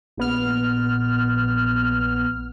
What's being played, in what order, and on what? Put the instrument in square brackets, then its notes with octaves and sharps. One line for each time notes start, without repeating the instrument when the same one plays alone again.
[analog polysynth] A#1 B3 F6